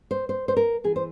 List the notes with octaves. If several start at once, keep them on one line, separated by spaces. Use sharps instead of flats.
C5
C5
C5
A#4
E3 G#4
C5